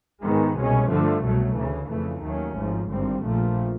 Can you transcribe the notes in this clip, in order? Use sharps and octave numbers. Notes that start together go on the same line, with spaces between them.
G#2 D#3 G#3 B3
C2 B2 G#3 C#4
G2 D3 F3 A3
C2 B2 F#3 A3
D2 C#3 E3
F2 C#3 E3 A3
D#2 D#3 F#3 A3 C#4
G#1 G#2 F3
G#1 G2 D3 G3 C4
A#1 A#2 F3 A3